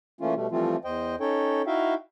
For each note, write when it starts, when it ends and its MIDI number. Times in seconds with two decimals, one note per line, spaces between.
0.21 0.34 52
0.21 0.34 57
0.21 0.34 58
0.21 0.34 61
0.21 0.34 65
0.35 0.47 47
0.35 0.47 55
0.35 0.47 57
0.51 0.76 52
0.51 0.76 53
0.51 0.76 55
0.51 0.76 57
0.51 0.76 60
0.51 0.76 65
0.84 1.16 40
0.84 1.16 72
0.84 1.16 75
0.84 1.16 79
1.20 1.62 61
1.20 1.62 63
1.20 1.62 69
1.20 1.62 73
1.20 1.62 79
1.67 1.94 63
1.67 1.94 64
1.67 1.94 66
1.67 1.94 76
1.67 1.94 77
1.67 1.94 79